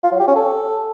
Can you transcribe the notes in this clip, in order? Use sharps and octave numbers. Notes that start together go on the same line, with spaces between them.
F4
F#3
G4
C#4
A4